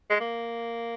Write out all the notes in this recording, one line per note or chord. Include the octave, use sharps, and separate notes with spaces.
G#3
A#3